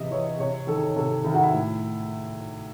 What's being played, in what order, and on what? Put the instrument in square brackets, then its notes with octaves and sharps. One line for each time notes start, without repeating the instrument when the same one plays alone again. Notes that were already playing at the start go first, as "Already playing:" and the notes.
Already playing: [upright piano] C3 E3 D#5 E5
E3 C#5
C3 C#5
D#3 A4
C3 A4
D#3 E4
F#4
E4
A2